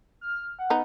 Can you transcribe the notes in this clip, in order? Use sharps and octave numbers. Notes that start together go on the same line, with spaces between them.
F6
F#5
B3 D#4